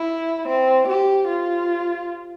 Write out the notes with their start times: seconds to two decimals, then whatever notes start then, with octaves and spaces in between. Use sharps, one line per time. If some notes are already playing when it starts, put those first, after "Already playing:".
Already playing: E4
0.48 C4
0.88 G4
1.28 F4